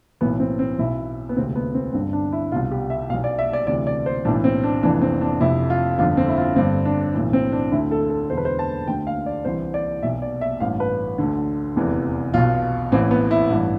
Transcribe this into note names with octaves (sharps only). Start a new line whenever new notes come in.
B1 A2 E3 B3
C4
C4
B1 B2 E4
B3
E1 D2 C3 C4
B3
C4
G1 G2 D3 C4
D4
E4
C2 B2 F4
G4
E5
B1 B2 F5
D5
E5
D5
D2 C3 E3 D5
D5
C5
B1 A2 E3 D4
C4
D4
F1 F2 E3 D4
C4
D4
F1 F2 C3 E4
F4
G1 F2 D3 F4
C4
E4
F4
G1 G2 D3 C4
D4
B1 A2 E3
C4
D4
D2 D3 E4
A4
A4
E1 E2 D3 C5
B4
C5
A5
D2 D3 G5
F5
D5
C2 C3 E3 C5
D5
B1 B2 E5
D5
E5
A1 G2 E3 F5
B4
D2 D3
F1 E2 C3 E3
B1 B2 F4
A1 A2 E3 C4
B3
E4
A1 G2 E3